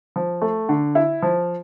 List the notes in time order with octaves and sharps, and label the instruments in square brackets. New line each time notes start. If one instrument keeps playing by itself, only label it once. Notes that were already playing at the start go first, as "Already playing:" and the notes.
[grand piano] F3
A3
D3
E4
F3